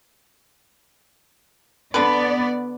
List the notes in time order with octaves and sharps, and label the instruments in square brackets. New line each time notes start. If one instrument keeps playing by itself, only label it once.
[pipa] D3 B4 [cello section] B3 D5